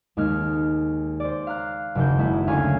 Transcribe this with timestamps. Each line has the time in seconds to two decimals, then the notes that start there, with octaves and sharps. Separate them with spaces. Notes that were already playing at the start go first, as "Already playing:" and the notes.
0.17 D#2 G#3 D#4 F6
1.20 C5 D5
1.47 F5 A#5 F#6
1.95 F#1 D#2 G6
2.18 G#3 A#3 E4
2.47 D2 C#4 F5 G#5 C#6